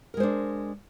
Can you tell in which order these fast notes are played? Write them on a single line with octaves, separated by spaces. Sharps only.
A#4 G#3 C5 D4